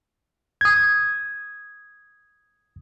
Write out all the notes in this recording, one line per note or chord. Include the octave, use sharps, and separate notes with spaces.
D#6 G#6